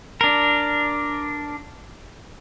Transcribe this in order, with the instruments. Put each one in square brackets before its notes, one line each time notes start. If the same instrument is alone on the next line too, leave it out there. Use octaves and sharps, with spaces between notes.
[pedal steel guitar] D4 A#4